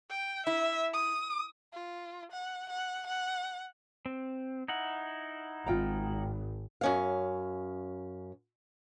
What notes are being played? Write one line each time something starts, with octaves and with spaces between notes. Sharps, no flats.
G5
E4 E5
D#6
F4
F#5
F#5
F#5
C4
D#4 E4 F#5
G#1 F4 G5 A#5
F#2 C#4 F5